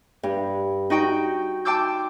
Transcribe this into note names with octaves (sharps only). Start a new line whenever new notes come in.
G2
D#4 F#4 G5
G5 A5 C6 D6 E6 G6